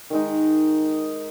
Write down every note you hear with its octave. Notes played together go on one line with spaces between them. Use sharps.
D#3 G#3 D#4